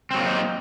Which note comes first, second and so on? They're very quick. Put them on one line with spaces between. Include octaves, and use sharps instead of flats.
C4 F#3 A#3 F4 D#4